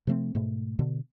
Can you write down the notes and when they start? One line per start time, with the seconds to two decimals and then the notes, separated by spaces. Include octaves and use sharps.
0.07 C3 F3 A3 C4
0.35 G#2 B2 A3
0.79 B2 D3